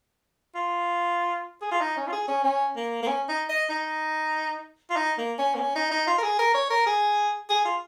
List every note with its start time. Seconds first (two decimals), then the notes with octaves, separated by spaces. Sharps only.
0.55 F4
1.61 G#4
1.71 F4
1.81 D#4
1.97 C#4
2.08 F4
2.12 G#4
2.28 C#4
2.44 C#4
2.76 A#3
3.03 A#3
3.07 C#4
3.29 D#4
3.49 D#5
3.70 D#4
4.90 F4
4.96 D#4
5.18 A#3
5.38 C#4
5.55 A#3
5.60 C#4
5.76 D#4
5.91 D#4
6.07 F4
6.18 A#4
6.23 G#4
6.39 A#4
6.54 C#5
6.70 A#4
6.86 G#4
7.49 G#4
7.65 F4